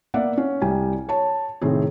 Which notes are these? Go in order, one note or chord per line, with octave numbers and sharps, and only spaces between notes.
A#3 B3 D5 E5 F#5
C#4
C2 G3 G5 G#5
C#5 A5
A2 C3 D#3 C4 G#4